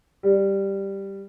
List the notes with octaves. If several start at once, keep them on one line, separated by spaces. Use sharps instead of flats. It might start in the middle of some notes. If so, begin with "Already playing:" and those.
G3